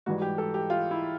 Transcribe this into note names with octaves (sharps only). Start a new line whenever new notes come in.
G#2 E3 G3 F#4
G4
A4
G4
F4
E4